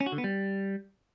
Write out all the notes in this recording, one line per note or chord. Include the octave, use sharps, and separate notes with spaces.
C#4
F#4
D3
B3
G3